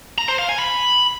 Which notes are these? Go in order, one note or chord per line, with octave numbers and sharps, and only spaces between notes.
A#5
C5
F5
G#5
B5